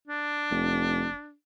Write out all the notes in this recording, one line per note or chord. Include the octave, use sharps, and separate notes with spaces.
D4
F1